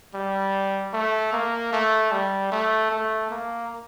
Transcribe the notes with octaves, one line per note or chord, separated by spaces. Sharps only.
G3
A3
A#3
A3
G3
A3
A3
A#3